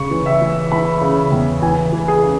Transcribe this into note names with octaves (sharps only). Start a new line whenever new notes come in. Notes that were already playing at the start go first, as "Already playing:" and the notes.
Already playing: C#3 C#6
E3
E5
E3
E3 B5
C#3
E2
E3 G#5
E3
G#4
C#3